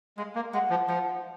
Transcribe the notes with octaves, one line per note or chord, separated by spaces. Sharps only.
G#3 F5
A#3
G#3 F#4
F3
F3 D#4